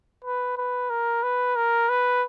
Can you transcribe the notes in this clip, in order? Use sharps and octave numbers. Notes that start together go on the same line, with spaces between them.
B4
B4
A#4
B4
A#4
B4